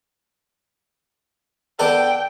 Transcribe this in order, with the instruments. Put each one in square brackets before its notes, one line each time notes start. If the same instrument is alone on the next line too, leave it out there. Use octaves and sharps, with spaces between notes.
[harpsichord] B3 D4 A4 [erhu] G5